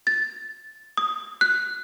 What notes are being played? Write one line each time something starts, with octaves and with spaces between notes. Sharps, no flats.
A6
D#6
F#6